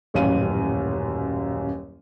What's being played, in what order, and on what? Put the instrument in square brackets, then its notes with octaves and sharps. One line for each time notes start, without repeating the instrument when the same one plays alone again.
[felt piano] D#1 A1 F#2 F5 D#7